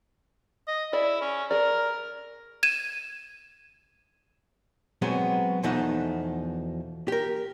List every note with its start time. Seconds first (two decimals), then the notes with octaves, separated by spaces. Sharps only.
0.67 D#5
0.93 E4 G#4 D5
1.21 C#4
1.51 G#4 A#4 D5
2.63 G#6 D#7 E7
5.02 B2 F#3 G#3 B3 C4
5.63 E2 B2 F3 A3 D#4 F#5
7.08 G4 A#4